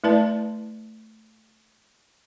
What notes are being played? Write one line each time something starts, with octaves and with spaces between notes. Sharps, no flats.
A3 E4 B4 D5 A5